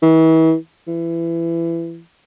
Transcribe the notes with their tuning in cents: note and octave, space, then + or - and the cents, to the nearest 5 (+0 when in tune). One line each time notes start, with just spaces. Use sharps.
E3 -35
E3 +20